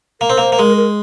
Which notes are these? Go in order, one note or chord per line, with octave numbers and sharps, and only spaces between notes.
A#3 A#4
C4
A#3 C5
A#3
G#3 A#4
A#4